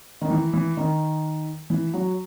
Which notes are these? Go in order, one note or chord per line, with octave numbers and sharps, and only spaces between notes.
D#3
E3
E3
D#3
E3
F#3